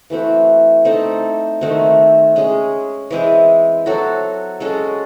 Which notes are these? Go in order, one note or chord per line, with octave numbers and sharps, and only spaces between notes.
E3 A3 C4 F#4
A3 C4 D#4 A4
D#3 A3 C4 F#4
G#3 C#4 G#4
E3 G#3 C4 E4
F#3 C4 F#4 A4
G#3 C#4 F#4 A4